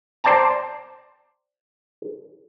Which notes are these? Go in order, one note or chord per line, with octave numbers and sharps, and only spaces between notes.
C5 D5 G5 A5 A#5